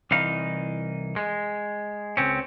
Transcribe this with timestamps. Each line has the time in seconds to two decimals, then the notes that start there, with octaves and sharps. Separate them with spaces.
0.11 C2 E3 D#4 F5
1.16 G#3
2.17 C#2 C4 C#4